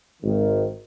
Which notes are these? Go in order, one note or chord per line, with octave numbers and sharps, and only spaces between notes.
G#1 D#3